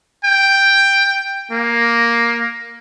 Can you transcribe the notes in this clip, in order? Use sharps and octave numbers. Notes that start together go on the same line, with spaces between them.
G5
A#3